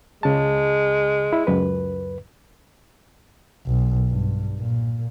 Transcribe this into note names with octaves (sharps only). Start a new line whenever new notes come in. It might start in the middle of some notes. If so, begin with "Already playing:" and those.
C#2 C#3 G#3 A5
E4
C#2 F#2 B4
B1
G2
A#2